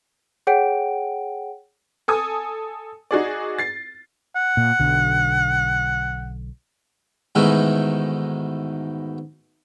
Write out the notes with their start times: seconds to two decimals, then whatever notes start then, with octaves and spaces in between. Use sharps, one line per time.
0.47 G#4 C#5 F#5 G5 D7
2.08 A4 G#5 D#6
3.11 D#4 F#4 G#4 D5
3.58 A6 C7
4.36 F#5
4.57 A#2
4.79 B1 D3
7.35 G#2 B2 D#3 E3 G#3 A3